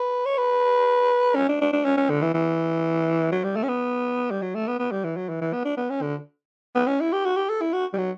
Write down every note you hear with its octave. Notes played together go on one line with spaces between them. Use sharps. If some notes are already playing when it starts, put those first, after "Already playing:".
Already playing: B4
C#5
B4
C#4
D4
D4
D4
C#4
C#4
D3
E3
E3
F#3
G3
A3
C#4
B3
G3
F#3
A3
B3
B3
G3
E3
F#3
E3
E3
B3
D4
B3
C#4
D3
B3
C#4
E4
G4
F#4
G4
A4
E4
F#4
G3
F#3